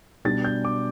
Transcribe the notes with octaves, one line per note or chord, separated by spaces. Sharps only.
B2 G3 D4 A6
G6
D6